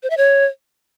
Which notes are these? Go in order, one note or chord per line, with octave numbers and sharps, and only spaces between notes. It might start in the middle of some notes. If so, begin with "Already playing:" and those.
C5
E5
C#5